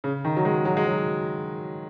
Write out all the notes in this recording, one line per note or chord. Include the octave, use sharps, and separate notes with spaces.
C#3
D#3
F#3
G#3
F#3
G#3
F#3